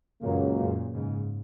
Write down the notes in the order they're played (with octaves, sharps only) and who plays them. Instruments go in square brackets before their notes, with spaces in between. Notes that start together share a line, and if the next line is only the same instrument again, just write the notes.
[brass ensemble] C#2 C#3 F#3 A#3 [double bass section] F#2 A#2
[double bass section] F#2 A#2
G#2 C#3